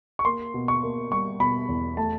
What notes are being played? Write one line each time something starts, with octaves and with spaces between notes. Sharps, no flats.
C#6
A#3 C6
B2
C#6
A#3
G3 C#6
B2 B5
E2
A3 A5